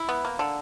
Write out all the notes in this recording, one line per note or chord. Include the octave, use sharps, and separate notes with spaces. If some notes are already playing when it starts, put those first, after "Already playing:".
Already playing: E4
B3
A#3
D3